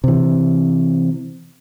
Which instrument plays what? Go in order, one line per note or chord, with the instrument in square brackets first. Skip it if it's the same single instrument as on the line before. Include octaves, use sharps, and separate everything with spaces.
[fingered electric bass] C3 E3